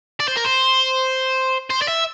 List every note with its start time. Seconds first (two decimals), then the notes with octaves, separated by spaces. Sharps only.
0.20 D5
0.28 C5
0.36 A#4
0.44 C5
1.70 C5
1.82 D5
1.88 E5